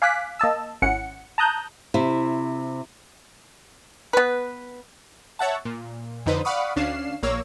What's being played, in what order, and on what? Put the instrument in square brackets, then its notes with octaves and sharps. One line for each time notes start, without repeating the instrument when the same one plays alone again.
[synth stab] F5 G#5 D6 F#6 B6
A#3 D#5 A5 E6
G#1 C#4 E4 F#5 C#7
A5 A#5 D#6 F#6 G6
[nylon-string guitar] C3 E4
[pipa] B3 B4
[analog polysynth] C#5 E5 F#5 A5
A#2
F2 D3 D#4 B4 C5
D5 F5 F#5 B5 C#6 D#6
D2 C#4 D4 F5 C7 E7
A#1 A#3 C#5 E6